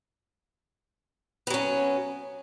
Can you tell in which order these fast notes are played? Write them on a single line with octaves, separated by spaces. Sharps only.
B3 F#3 C#4